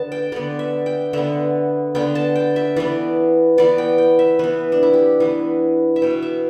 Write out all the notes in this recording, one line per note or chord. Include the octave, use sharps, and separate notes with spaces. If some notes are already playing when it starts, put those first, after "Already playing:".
Already playing: D3 B3 A5
G5
D3 B3 D5
E5
G5
D3 B3 E5
D3 B3 G5
A5
G5
E5
E3 B3 D5
E3 B3 D5
G5
G5
E5
E3 B3 B4
D4
E4
G4
E3 B3 E4
E5
B2 B3 G5
E5